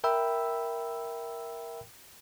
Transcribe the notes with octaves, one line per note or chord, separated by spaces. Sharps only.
A#4 E5 G5 B5 E6